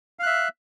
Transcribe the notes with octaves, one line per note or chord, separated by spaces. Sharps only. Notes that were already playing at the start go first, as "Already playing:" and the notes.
E5 F5 F#6